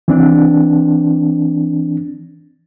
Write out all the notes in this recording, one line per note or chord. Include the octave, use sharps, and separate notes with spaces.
E3 C4 D4